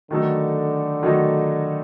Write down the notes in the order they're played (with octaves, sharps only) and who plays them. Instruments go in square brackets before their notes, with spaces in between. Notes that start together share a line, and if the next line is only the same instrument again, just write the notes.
[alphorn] D3 [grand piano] D#3 F#3 A3 D#4 A4
[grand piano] D#3 F#3 A3 D#4 A4